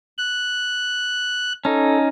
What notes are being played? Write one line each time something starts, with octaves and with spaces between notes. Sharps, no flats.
F#6
C#4 D#4 A4